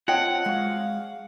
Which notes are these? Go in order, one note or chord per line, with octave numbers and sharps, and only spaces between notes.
C4 F4 C#5 D#5 F#5 G5 A5
G#3 F#4 C#5 F5